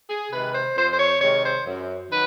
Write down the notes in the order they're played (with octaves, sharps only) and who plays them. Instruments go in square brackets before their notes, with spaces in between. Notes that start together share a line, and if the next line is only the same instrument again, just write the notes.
[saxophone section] G#4
C3 D#3 G#3 B4
C5
F2 C5
C5
C#5
C3 D#3 G#3 C#5
C5
F#2
D#3 F#3 B4